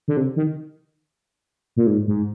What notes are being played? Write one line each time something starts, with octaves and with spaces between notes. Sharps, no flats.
D3
C3
D#3
A#2
G#2
G#2